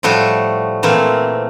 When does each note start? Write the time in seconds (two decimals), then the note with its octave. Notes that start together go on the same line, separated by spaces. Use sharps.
0.03 A2 F3 G3 A3 F#4
0.83 A#2 E3 A3 A#3 C4